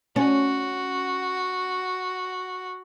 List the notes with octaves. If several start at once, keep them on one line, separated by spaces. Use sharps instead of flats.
C#4 F#4